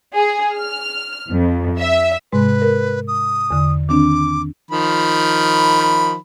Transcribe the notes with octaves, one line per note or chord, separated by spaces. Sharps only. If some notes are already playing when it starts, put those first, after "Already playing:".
G#4
F6
F2
E5
G#2 C3 G#3 B4
A#4
D#6
E2 D3
D#3 C4 D4 D6
D#3 F3 B5